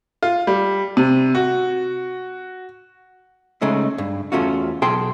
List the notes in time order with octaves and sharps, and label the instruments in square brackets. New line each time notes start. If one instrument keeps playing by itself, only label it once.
[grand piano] F4
G3
C3
F#4
[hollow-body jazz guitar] C#3 G#3 A3 D#4
G2
E2 A3 C#4 F4 F#4
B1 G#4 G5 A5 C6